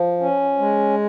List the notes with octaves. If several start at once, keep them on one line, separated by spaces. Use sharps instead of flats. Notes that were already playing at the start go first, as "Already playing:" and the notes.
Already playing: F3
C#4
G#3